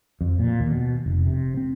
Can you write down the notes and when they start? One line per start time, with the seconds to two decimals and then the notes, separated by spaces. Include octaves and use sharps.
0.21 F2
0.39 A#2
0.60 D#2
0.71 B2
1.06 F1
1.26 C3
1.57 C4